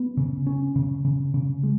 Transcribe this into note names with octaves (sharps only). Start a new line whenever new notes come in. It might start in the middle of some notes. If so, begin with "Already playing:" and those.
Already playing: B3
C#3
C#4
C#3
C#3
C#3
G#3